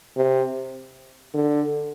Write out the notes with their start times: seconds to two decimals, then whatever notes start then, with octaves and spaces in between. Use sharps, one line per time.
0.17 C3
1.34 D3